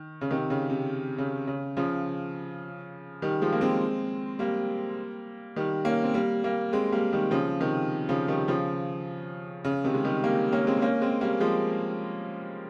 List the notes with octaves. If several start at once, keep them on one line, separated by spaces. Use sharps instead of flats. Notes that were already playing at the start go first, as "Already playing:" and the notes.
Already playing: D#3
C#3
C3 D#3
C#3
C3
C#3
C#3
C#3 F3
D#3 G3
F3 G#3
A#3
G#3 C4
G3 A#3
D#3 G3
A#3 C#4
C4
G3 A#3
G3 A#3
G#3 C4
G3 A#3
D#3 G3
C#3 F3
C3 D#3
C#3 F3
D#3 G3
C#3 F3
C#3
C3 D#3
G#3
D#3 G3
G3 A#3
A#3 C#4
G#3 C4
A#3 C#4
G#3 C4
G3 A#3
F3 G#3